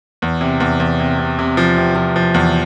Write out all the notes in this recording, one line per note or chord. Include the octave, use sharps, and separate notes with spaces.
E2
C3
E2
E2
C3
C3
C3
F3
C3
F3
F3
E2